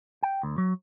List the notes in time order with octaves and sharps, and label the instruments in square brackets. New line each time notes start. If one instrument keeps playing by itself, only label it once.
[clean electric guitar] G5
D2
F#3